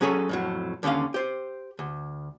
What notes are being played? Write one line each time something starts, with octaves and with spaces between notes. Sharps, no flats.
F#3 C#4 G#4 A4 C#5
F2 A2 F#3
D#2 D3 F#3 C#4 F5
G4 C5
D2